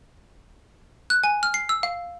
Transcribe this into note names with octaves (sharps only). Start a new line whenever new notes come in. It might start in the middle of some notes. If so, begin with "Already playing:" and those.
F#6
G#5
F6
C7
E6
F5